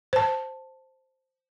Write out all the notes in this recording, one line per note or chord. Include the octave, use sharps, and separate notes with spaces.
C5 A5